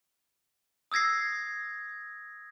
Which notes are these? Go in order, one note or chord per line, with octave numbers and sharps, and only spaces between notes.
D#6 E6 G#6 A#6 C7